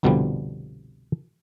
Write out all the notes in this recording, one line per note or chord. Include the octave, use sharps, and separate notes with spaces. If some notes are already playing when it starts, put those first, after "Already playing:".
G1 C2 B2 D3 F3 G3